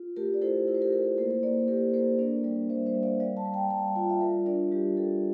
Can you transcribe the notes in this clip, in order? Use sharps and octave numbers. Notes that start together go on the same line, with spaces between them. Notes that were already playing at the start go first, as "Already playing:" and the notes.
Already playing: F4
A3 G4 A#4
D5
E4 A4 C5
E4 A#4
C5
G4 A#4
E4 G4 A#4
A#3 A4 C5
A4 C5
A#3 A#4 D5
A4
A#3 G4 A#4
A#3 A4 C5
D4 A#4 D5
G3 A#4 D5
G3 C5 E5
C5 E5
G3
D5 F5
G3 D5 F5
F5 A5
G3
G5 A#5
G3 F5 A5
G5
F4 F5
E5
G3 A#4 D5
D4 A#4 D5
G3 G4
G3 A4